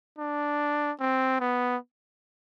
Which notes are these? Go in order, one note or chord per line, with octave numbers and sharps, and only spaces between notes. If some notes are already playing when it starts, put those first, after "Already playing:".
D4
C4
B3